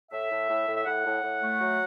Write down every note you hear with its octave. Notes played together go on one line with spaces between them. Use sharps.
A2 E5
A2
A2
A2
E5
A2 F#5
A2
A2
A3
F#3